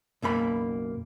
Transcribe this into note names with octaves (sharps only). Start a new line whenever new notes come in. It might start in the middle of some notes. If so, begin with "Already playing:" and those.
B1 F#2 A#3 B5